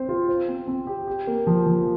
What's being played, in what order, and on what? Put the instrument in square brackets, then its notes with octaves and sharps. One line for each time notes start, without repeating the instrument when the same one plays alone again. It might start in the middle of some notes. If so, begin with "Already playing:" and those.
Already playing: [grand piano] C4 C5
F4
C5
C4
C4
G4
G4
A#3
F3
F3